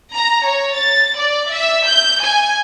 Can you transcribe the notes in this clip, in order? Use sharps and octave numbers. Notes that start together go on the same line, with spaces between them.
A#5
C#5
A6
D5
E5
G6
G#5